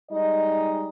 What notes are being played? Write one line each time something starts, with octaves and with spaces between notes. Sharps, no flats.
G3 G#3 D#4 D#5